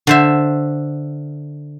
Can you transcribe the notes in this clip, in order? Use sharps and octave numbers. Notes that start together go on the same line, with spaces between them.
D3 C5 E5